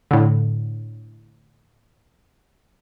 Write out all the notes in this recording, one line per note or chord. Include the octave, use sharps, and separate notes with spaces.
A2 D3